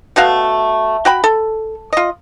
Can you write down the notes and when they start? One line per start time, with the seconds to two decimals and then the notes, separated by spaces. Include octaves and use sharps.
0.16 B2 A3 F#4 F5
1.05 F#4 G5 B5
1.24 A4
1.93 F4 D#5